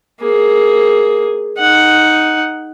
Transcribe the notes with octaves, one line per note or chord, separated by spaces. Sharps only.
A#3 G#4
D#4 F#5